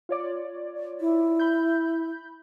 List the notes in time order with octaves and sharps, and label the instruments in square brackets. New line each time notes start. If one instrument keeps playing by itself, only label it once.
[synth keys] F4 C#5 D5
[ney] E4
[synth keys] B5 G6